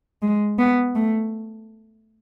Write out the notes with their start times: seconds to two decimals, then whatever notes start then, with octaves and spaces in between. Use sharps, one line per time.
0.22 G#3
0.59 B3
0.95 A3